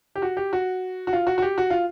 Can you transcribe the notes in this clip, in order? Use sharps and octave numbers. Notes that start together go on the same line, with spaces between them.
G4
F#4
G4
F#4
F#4
F4
F#4
F#4
G4
F#4
F4